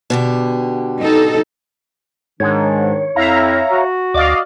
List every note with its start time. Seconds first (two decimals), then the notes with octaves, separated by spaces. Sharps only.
0.10 B2 D3 G4
1.01 D#4 A4
2.40 G#2 D#3 D4 C#5
3.16 F2 E4 E5 F5 A#5
3.71 F#4
4.14 D2 D5 D#5 F5 D6